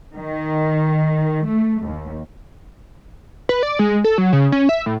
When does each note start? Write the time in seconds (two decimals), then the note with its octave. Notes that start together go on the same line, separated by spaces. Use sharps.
0.16 D#3
1.47 A3
1.85 D#2
3.49 B4
3.63 D5
3.79 G#3
4.04 A4
4.18 F#3
4.33 C#3
4.52 C#4
4.69 E5
4.86 A2